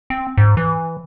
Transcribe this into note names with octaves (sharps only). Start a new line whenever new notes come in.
C4
G#2
E3